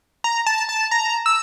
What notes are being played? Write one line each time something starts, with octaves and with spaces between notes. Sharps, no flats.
A#5
A5
A5
A#5
E6